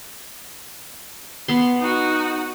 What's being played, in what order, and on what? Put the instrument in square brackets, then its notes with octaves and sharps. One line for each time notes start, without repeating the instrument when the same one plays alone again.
[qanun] B3 C6
[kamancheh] D#4 F#4